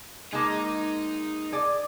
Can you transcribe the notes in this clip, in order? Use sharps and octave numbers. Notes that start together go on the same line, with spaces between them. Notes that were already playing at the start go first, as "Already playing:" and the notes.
G#3 A#3 D#4 G#4
G#4 D5